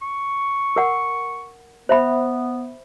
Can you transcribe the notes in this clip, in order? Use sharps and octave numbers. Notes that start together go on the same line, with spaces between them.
C#6
A#4 F#5
B3 C5 E5 B5